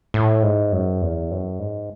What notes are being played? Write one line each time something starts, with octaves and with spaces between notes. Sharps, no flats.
A2
G#2
F#2
E2
F#2
G#2